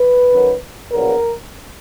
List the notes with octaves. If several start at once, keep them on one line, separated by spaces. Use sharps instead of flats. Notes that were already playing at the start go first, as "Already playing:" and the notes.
Already playing: B4
F#2 D#3 F#3
A#1 A#2 F#3 B3 A#4